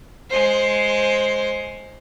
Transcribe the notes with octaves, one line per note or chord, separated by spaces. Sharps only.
G#3 C5